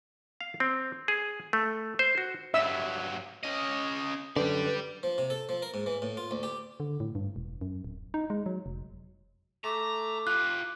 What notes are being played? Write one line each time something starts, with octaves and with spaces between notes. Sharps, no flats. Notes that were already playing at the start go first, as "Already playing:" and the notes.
F5
C4
G#4
A3
C5
F#4
G2 F#3 E5 E6
C#4 D#5
F#2 D3 G4 B4 D5
F3
C3
A4
F3
A#4
G#2
E3
A2
F4
D2
G4
D3
A2
G2
E1
F#2
D1
D#4
G#3
F#3
F1
A3 A#5 D6
F4 G4 F#6